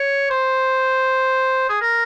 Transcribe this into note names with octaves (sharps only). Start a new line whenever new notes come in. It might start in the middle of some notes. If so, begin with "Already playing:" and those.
Already playing: C#5
C5
G#4
A#4